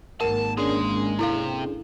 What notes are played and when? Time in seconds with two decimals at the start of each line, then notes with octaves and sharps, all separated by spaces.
0.21 G#1 A#3 A#4 F#5 A5
0.57 G#3 C#4 D4 G#4
1.19 C3 E4 A4 F5